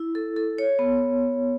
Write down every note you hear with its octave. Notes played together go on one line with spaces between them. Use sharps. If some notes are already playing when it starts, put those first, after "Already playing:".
Already playing: E4
A4
A4
C#5
B3